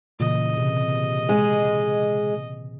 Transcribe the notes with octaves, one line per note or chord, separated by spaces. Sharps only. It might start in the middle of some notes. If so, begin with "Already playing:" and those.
A#2 C#3 E3 D#5
C3
G#3